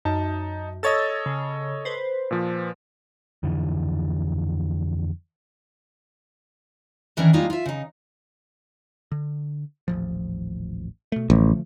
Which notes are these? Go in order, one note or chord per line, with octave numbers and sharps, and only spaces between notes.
F#2 D#4 A5
A4 C#5 D#5 E6 A6
C#3
B4 C5
A#2 F3
F2 D3 E3
D#3 E3 C#4 D4 A#4
G3 G#3 A#3 D#4 F4
F4 E5
C#3 D#4
D3
D#1 A1 F3
B2 A3
A1 D3 F3 A3